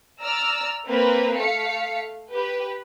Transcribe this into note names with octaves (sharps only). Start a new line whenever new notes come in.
D5 A#5 E6 F6
A#3 C4 A#4 B4
A3 F5 B6 C#7
G4 B4